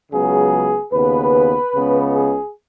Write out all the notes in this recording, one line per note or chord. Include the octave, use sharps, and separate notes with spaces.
C#2 C#3 F#3 B3 G#4
D#2 C#3 B3 B4
C#2 C#3 B3
G#4